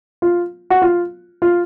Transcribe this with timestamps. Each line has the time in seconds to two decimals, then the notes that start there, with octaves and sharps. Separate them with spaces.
0.22 F4
0.70 F#4
0.82 F4
1.42 F4